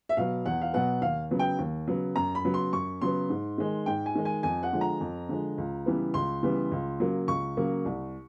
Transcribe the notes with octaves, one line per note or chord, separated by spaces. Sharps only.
E5
B2 F#3 B3 F5
E2 F#5
F5
B2 F#3 B3 F#5
D#2 F5
C#3 F#3 B3
G5
D#2
C#3 F#3 B3
F#2 A#5
B5
C#3 F#3 B3
C6
F#2 C#6
C#3 F#3 B3 C6
G#2
D#3 G#3
G#2 G5
G#5
D#3 G#3
G#5
F2 G#5
F#5
D3 F3 G#3
A#5
F2
D3 F3 G#3
C#2
C#3 E3 G3 B3
C#2 C6
C#3 E3 G3 B3
C#2
C#3 F#3 A#3
C#2 C#6
C#3 F#3 A#3
C2